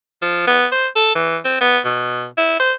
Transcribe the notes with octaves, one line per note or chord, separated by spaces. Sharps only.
F3
B3
C5
A4
E3
C4
B3
B2
E4
C5